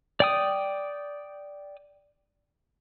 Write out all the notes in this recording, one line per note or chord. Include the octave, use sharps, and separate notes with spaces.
D5 G5 D#6